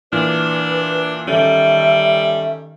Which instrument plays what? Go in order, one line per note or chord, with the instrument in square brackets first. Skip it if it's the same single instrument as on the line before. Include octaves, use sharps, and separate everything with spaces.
[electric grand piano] A#2 E3 F6 [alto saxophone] D4 [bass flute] B4
[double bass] D#3 [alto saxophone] G3 [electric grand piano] C#4 A4 [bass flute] E5